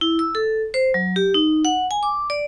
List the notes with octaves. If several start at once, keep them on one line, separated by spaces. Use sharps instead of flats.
E4
E6
A4
C5
F#3
G4
D#4
F#5
G#5
D6
D5